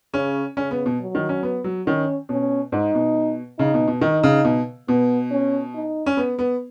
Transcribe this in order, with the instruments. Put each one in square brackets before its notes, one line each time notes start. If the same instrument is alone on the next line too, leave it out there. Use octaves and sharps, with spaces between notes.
[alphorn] C#3 [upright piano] C#4
[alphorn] C#3 [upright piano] C#4
[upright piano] B3
B2
[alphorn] F#3
[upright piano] D#3
C#4
B3
F#3
[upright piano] D#3 [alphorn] C#4
[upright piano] B2 [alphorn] C#4
[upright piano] G#2 [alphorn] D#4
[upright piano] B2
[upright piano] C#3 [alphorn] D#4
[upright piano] B2
B2
[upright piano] D#3 [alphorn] D#4
[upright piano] C#3
B2
[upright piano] B2 [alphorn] B3
[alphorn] C#4
D#4
[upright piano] C#4
B3
B3